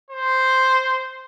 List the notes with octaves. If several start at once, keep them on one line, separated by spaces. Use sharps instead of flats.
C5